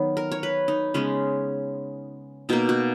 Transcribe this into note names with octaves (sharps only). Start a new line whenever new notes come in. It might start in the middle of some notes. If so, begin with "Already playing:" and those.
Already playing: D#3 F#3 B3
A#4
C#5
B4
D#4
C#3 G#3 B3 C#4
B2 A#3 D#4
F#4